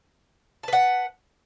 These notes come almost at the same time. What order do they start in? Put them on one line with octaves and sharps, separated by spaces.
A5 B4 F#5